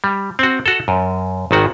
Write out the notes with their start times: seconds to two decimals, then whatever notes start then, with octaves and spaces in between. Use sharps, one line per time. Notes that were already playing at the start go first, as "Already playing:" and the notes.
0.04 G3
0.39 C4 F#4
0.66 F#4 A4
0.88 F#2
1.51 G#1 D#3 F#4